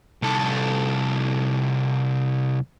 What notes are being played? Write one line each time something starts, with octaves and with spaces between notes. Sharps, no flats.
C2 A4